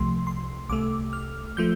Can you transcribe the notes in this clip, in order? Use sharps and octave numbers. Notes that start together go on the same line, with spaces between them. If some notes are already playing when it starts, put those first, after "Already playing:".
Already playing: C2 C3 F3 A3 C6
C6
C2 C3 A3 D6
F6
F3 A3 G6